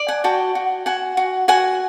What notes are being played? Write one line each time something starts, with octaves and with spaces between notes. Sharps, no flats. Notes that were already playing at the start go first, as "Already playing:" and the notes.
Already playing: D5
F#5 G#5
F#4 G5 A5
F#4
F#4 F#5 G#5
F#4
F#4 F#5 G#5